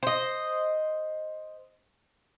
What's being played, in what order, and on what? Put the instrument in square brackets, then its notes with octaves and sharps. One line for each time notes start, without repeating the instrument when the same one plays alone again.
[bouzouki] C5 D#5